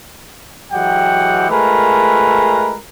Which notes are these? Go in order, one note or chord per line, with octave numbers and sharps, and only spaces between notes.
E3 F#3 G#3 G4 F#5 G5
G#3 A3 F4 A#4 B4